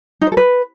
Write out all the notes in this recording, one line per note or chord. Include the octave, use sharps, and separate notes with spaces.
D#4
C5
A4
B4